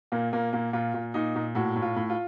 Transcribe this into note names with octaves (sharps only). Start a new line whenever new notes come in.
A#2 A#3
A#2 A#3
A#2 A#3
A#2 F4
A#2
A#2 D#4
A#2
A2 F#4
A2
F4
A2
F4